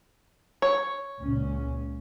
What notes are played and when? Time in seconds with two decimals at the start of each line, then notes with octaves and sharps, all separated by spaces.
0.62 C#5
1.19 C#2 A#2 C#4